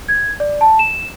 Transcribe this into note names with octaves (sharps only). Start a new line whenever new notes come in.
G#6
D5
A5
E7